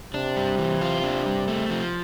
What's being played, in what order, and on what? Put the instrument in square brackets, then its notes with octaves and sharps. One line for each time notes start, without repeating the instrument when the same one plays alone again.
[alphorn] C3 [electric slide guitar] D4
[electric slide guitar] G3
E3
F4
D4
G3
A3
F3